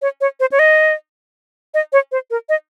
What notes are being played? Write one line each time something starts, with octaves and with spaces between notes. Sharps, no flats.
C#5
C#5
C5
C#5
D#5
D#5
C#5
C5
A#4
D#5